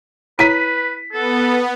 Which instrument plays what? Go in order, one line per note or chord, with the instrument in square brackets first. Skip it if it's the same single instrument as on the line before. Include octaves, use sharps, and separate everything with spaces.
[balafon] E4 C#5 A#5 [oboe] B4 [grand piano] B6 D#7
[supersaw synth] B3 [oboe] A4